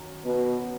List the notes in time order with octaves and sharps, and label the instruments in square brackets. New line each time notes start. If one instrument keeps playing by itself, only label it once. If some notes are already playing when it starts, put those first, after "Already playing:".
Already playing: [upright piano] F#2 D#3 F#3
[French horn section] B2